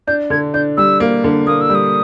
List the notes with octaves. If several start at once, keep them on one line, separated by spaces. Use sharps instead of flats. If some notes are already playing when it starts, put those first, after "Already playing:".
D4 G6
D3 G#6
D4 G6
G3 E6
A#3
D3
A#3 D#6
E6
G3
D#6